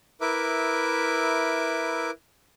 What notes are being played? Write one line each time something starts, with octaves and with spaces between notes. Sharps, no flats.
E4 A#4 B4 E5 D6